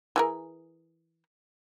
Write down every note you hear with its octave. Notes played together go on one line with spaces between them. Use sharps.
E3 G#4 A#4